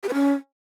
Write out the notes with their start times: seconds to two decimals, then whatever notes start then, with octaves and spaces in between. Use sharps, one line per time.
0.03 G4
0.09 B4
0.14 C#4